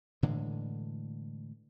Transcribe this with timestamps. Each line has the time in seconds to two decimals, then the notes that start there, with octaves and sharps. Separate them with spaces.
0.23 A2 D3 E3 G#3